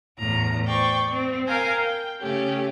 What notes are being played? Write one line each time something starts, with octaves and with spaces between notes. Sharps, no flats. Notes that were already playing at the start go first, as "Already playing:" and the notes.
E2 A2 A#5
C5 D5 G5 C#6
C4
A#4 F5 G5 G#5 A#5
G5
C#3 A3 C#4 G4